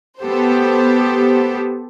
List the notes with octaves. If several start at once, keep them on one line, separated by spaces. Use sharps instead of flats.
B3 G4 A4 C5